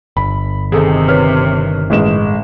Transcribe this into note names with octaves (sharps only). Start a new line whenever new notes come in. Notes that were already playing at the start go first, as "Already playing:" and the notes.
G1 B5
C3 D#3 G#4 A4
B4 C#5 F6
A1 G#3 E7